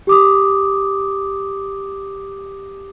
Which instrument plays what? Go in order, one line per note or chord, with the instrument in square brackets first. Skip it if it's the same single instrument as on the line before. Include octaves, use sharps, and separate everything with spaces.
[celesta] G4 D6 D#6